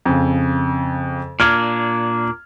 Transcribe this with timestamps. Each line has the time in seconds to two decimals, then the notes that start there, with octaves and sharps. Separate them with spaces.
0.05 F2 C#3
1.40 A#2 A#3 D4 F6 G#6